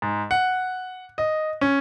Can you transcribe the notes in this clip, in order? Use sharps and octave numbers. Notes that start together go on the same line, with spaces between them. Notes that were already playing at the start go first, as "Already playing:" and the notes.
G#2
F#5
D#5
C#4